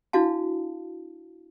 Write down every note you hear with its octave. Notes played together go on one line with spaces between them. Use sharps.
D4 E4 F#4 F5 A5